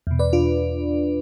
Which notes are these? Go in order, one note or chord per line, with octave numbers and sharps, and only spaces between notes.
E2 B2
B4 D5
D4 F4